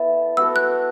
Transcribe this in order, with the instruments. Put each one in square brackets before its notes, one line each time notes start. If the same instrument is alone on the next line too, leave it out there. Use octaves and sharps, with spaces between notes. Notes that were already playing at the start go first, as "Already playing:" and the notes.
Already playing: [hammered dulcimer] B3 E4 A4
[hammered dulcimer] B3 F#4 A4 [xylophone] E6
[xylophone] F#6